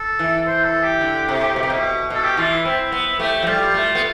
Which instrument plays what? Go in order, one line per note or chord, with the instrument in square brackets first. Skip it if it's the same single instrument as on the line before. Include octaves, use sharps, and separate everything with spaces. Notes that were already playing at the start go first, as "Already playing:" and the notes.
Already playing: [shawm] A4
[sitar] E3
[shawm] C5
A4
G4
[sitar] D3
C3
B2
C3
B2
[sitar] B2 [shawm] A4
[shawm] G4
[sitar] E3 [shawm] F4
[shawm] E4
[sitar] C4 [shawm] E4
[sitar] B3
[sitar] A3 [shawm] G4
[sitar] F3
[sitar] G3 [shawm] F4
[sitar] A3
B3